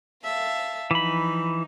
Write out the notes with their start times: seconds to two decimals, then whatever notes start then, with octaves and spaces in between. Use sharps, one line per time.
0.23 E5 F5 A5
0.91 E3 F3 D#4 B5